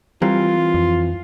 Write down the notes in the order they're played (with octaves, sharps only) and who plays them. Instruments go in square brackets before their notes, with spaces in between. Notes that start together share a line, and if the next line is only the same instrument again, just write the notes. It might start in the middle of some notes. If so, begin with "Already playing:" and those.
[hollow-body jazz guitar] E3 C4 A#4 [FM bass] G3 [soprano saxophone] F4
[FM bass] F2